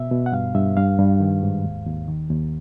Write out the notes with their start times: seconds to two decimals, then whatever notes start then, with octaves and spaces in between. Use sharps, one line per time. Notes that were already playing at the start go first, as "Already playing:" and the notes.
Already playing: B2 E5
0.11 B2
0.26 F#5
0.32 G2 F5
0.55 G2 E5
0.77 G2 F5
0.99 G2
1.20 D#3
1.43 G#2
1.65 D#2
1.87 D#2
2.08 D#3
2.29 D#2